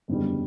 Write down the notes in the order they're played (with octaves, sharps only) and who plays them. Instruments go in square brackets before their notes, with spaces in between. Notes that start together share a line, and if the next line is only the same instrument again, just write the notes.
[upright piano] F#1 E2 D3 G3